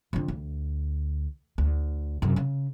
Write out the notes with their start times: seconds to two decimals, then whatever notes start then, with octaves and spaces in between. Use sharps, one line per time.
0.13 F2 D3
0.28 D2
1.58 D2
2.22 F#2 C3
2.36 C#3